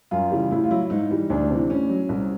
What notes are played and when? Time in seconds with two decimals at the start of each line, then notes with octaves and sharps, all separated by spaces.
0.11 F#2 F4
0.31 C#3 E3 G3
0.51 A2 E4
0.64 F4
0.71 F#3 E4
0.90 G#2 D#4
1.11 E3 G3
1.30 D2 D4
1.50 C3 E3
1.70 A2 C#4
1.90 F#3
2.09 C2